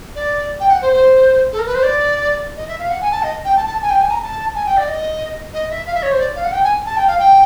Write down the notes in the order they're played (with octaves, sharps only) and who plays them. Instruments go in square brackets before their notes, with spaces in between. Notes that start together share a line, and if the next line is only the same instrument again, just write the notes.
[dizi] D5
G5
F#5
C5
C5
A4
A#4
B4
C5
D5
D#5
E5
F5
F#5
G#5
A5
D#5
G5
A5
A5
G#5
G5
G#5
A#5
A5
G#5
G5
D5
D#5
D#5
E5
F5
E5
C#5
C5
D5
F5
F#5
G5
G#5
A5
G5
F5
G5